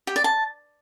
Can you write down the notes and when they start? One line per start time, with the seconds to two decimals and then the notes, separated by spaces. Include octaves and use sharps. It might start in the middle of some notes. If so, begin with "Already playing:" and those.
0.07 G4
0.16 D5
0.24 A5